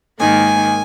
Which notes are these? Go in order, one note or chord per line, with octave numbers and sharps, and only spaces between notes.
G#2 D#3 A#3 G#5